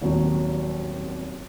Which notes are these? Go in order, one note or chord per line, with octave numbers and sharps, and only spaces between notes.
D#1 G#1 D#2 F#3